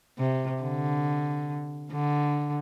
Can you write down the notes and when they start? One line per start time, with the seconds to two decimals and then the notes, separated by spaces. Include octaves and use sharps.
0.18 C3
0.62 D3
1.92 D3